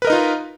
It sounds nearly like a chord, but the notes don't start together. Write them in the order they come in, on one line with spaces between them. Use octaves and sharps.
B4 A#4 D#5 D#4 F4